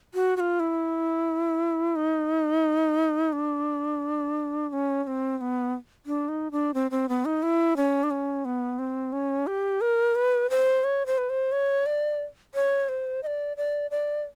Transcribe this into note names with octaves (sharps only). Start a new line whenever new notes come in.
F#4
F#4
F4
E4
D#4
D4
D4
C#4
C#4
C4
C4
B3
D4
D#4
D4
C4
C4
B3
D#4
E4
C#4
D4
C#4
B3
C4
C#4
G4
A#4
B4
C5
C#5
C5
B4
C5
C#5
D5
C#5
C5
D#5
D5
D5
D5